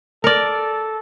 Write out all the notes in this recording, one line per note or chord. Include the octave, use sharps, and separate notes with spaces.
A4 A#4 D5